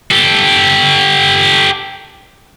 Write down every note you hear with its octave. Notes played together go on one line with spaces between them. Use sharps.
G4 A4